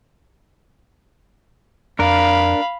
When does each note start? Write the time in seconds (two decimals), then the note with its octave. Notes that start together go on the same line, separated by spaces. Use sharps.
1.99 F2 D4 A#4 F5 B5